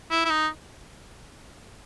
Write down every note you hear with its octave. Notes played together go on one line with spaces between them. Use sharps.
E4
E4
D#4